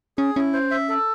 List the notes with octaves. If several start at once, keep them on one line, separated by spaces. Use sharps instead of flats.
C#4 G#4
C#4 E4
C5
E5
A4